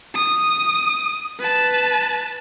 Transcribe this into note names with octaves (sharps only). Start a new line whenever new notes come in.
D#6
B4 A5